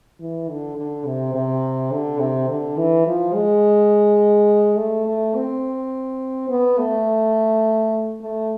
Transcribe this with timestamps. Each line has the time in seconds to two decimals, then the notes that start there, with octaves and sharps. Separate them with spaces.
0.20 E3
0.49 D3
0.77 D3
1.05 C3
1.34 C3
1.91 D3
2.20 C3
2.49 D3
2.77 E3
3.07 F3
3.34 G#3
4.77 A3
5.07 A3
5.35 C4
6.49 B3
6.78 A3
8.21 A3